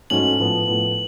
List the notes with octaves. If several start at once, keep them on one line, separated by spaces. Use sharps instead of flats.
G#2 F#3 A3 C#4 F#7
A2 F3 B3
A2 F3 B3